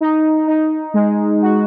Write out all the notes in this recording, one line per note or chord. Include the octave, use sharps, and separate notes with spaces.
D#4
D#4
G#3
F#4